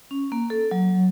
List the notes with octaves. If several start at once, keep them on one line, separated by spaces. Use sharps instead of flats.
C#4
A#3
A4
F#3